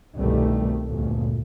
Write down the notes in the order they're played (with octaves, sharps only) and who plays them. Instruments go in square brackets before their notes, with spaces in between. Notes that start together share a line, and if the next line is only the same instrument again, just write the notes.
[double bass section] G1 C2 B2 D#3 G3 A3
G1 D2 A#2